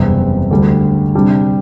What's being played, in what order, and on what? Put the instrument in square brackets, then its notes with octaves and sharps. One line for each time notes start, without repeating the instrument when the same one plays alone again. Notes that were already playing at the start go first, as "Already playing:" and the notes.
Already playing: [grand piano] F#1 E2 C3 G3 C4
D2 D3 G3
C3 G3 D4